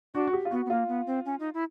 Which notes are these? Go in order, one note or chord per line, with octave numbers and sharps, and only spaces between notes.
D4 F#4
F#4
G4
F4
B3 F#4
B3
A#3 F4
B3
C4
C#4
D#4
E4